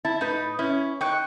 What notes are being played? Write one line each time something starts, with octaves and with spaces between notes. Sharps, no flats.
E4 A5
A2 D#4 B4
C#4 E4
D#4 G5 C#6 F#6